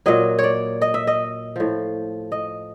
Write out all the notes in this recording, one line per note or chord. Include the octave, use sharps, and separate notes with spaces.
A#2 F#3 D#5
C#5 D5
D#5
E5
D#5
A2 F3
D#5